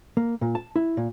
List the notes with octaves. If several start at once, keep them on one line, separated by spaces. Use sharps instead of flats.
A#3
A#2
A5
E4
A#2